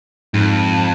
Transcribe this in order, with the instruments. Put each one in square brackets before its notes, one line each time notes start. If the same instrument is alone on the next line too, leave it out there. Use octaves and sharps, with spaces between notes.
[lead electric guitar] F2 [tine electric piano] G#2